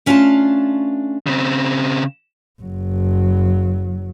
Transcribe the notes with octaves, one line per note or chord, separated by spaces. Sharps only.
A3 C#4 D4 F4 F5 A5
C#3 C4
F#1 F#3